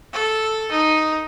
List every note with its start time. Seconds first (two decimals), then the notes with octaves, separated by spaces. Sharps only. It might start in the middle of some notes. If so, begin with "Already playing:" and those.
0.13 A4
0.72 D#4